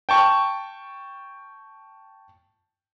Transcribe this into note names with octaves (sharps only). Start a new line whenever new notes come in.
G5 A5 C#6